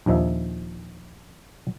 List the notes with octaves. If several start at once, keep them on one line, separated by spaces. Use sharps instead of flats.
A#1 D#2 F3 D#4 E5